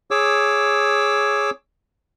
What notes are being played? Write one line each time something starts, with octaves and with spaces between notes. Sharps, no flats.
G#4 C#5 D6 E6